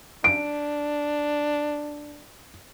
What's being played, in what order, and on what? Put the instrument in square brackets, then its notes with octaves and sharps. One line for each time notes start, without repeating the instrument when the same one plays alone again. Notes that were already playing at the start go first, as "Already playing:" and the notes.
[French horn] D4 [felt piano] D7